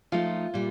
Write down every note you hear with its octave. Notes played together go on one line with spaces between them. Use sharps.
F3 A3 D#4 F4
A#2 G3